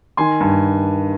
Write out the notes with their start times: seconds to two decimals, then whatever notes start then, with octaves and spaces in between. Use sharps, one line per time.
0.17 D#3 G#5 C6
0.40 G2